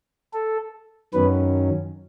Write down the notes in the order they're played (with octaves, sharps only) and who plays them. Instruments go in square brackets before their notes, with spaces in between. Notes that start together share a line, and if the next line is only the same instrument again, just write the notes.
[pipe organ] A4
F#2 D#3 F#3 B3 C#4 B4